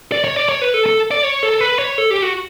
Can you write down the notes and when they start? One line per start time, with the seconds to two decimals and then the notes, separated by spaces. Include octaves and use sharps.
0.12 D5
0.24 C#5
0.36 D5
0.49 C#5
0.61 B4
0.74 A4
0.86 A4
1.11 D5
1.23 C#5
1.43 A4
1.60 B4
1.79 C#5
1.98 A4
2.11 G4
2.22 F#4